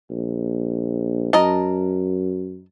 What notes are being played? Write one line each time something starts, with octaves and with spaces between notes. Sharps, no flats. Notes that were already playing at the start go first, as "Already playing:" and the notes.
A#1
F#2 A#4 D#5 A5